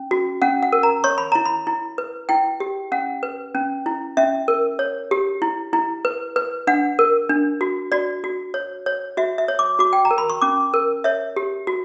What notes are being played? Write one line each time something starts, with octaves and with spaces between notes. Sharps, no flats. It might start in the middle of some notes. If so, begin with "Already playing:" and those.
Already playing: C#4
F#4
C#4 F#5
F#5
A#4
A#5
C#5 C#6
B5
E4 A#5
B5
E4
B4
E4 G5
G4
C#4 F#5
B4
C#4
E4
C#4 E5
A#4
C#5
G4
E4
E4
B4
B4
D4 F#5
A#4
D4
F#4
F#4 D5
F#4
C#5
C#5
F#4 E5
E5
C#5
D6
F#4 D6
G5
A#5
A#4
B5
C#6
C#4 D6
A#4
C#5 E5
G4
F#4